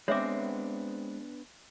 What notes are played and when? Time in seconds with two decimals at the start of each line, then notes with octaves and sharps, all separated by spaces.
0.08 G#3 B3 C4 D4 B4 C#5 E5 D6